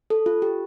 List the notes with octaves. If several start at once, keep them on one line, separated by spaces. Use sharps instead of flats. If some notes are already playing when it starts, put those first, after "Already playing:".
A4
F4
G4